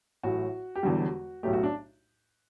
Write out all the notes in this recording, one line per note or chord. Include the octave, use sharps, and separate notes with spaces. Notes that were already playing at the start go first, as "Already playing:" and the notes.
A1 A2 F#3 F#4
G4
E1 E2 D3 G3 F#4
B1 A2 F#3 A3 G4
F#4
D4